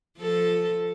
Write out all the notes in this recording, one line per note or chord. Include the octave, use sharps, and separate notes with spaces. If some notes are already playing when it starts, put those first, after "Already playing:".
F3 A4